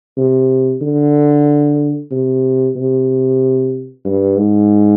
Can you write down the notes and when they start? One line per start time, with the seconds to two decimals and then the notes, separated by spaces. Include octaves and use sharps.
0.17 C3
0.81 D3
2.11 C3
2.76 C3
4.05 G2
4.37 G#2